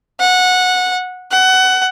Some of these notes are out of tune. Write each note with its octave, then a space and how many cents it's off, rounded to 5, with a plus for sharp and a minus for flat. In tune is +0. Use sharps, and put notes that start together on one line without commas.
F#5 -15
F#5 +20